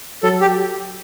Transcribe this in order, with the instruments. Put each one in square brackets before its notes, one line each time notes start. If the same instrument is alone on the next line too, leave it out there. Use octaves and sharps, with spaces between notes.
[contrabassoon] F#3 [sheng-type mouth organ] A4
[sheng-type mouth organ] G4